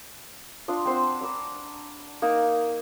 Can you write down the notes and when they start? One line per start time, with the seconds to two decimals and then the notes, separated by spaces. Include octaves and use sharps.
0.68 D4 F4 D#6
0.85 C4 C5 F#5 E6
1.21 A#5 B5 D6 E6
2.22 A#3 D#4